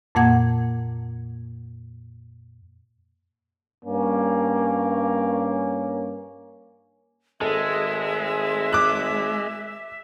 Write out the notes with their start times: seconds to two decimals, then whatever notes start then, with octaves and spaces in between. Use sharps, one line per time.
0.15 F2 A#2 A#3 F#5 G#6
3.84 G2 A#3 C#4
7.41 G#1 G#3 A4 E5
8.73 D6 F#6